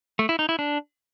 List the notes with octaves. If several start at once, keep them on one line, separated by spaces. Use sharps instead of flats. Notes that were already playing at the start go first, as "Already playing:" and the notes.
A3
E4
D#4
E4
D4